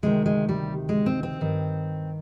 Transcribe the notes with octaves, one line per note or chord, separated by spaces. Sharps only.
D2 C3 D#3 G#3
G#3
G3
G#3
C4
C4
G2 D#3